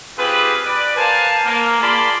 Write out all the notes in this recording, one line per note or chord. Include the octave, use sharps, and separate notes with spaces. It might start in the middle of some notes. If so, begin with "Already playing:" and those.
C4 F4 G4 G#4 B4
B4 D5
A#4 C5 F5 G#5 A5
A#3
F4 G#4 D5 A5 B5 C6